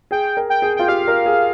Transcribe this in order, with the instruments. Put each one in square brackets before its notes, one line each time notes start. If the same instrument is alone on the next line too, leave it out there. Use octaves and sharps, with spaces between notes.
[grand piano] G#4 [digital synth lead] G5
[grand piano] A#4
[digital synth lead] G5
[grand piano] G#4
[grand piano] F4 [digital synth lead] G5
[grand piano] G4 [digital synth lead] F5
[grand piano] A#4
G#4